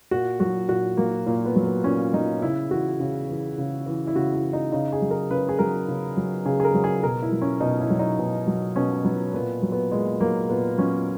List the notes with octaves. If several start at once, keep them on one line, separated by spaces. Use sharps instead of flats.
A#2 F#4
F#3 F#4
A#2 F#4
F#3 A#3
A#2 A#3
B3
F#3
B3
A#2 C#4
F#3 D#4
C#3 E4
E3 F#4
C#3
E3
C#3
E3
E4
C#3 F#4
E4
E3
D#4
C#3 D#4
G#4
F#3
A#4
C#3 B4
G#4
F#3 A#4
C#3
F#3
C#3 G#4
G#4
A#4
F#3
G#4
B2 A#4
E4
F#3
C#4
B2 D#4
E4
F#3
D#4
B2
F#3
B2 C#4
F#3 B3
A#2 B3
F#3
B3
A#2 G#3
F#3 A#3
A#2 B3
F#3 C#4